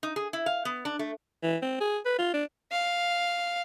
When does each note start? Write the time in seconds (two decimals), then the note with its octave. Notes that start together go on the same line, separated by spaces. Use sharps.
0.03 D#4
0.16 G#4
0.33 E4
0.46 F5
0.65 B3
0.85 D4
0.99 A3
1.43 E3
1.62 C4
1.81 G#4
2.05 B4
2.19 F4
2.34 D4
2.72 F5